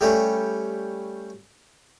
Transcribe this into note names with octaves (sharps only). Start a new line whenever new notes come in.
G3 A3 C#4